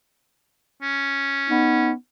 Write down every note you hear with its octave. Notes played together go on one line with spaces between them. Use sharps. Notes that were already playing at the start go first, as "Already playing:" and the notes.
C#4
B3 D#4